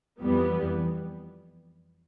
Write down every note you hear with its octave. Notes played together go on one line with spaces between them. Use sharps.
F2 E3 G3 B3